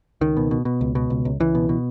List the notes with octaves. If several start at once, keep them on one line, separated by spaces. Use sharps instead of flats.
C#2 D#3
B2
B2
B2
C#2
B2
C#2
C#2
C#2 E3
B2
B2